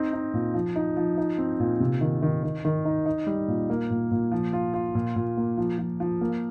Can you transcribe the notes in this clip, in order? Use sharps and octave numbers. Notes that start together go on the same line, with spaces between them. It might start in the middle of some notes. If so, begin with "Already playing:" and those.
Already playing: C4 D#4
D#4
A#2
F3
D#4
F3
D#4
C4
A#2
C3
D#3
D#3
D#3
D#3
D#4
D#4
G3
A#2
A#3
A#2
A#2
F3
F4
F4
A#2
A#2
A#3
F3
F3
F3
A#3